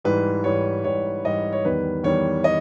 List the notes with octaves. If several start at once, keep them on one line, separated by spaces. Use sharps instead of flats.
G#2 E3 G3 B4
G#2 E3 G3 C#5
G#2 E3 G3 C#5
G#2 E3 G3 D#5
C#5
E2 D#3 G3 B4
E2 D#3 G3 C#5
D#5